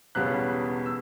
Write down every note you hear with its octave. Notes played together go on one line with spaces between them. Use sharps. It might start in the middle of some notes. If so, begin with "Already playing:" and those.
E1 E2 C#3 G3 B3 F#6
E6